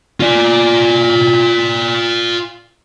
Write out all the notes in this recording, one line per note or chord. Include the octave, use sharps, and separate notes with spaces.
F4 D5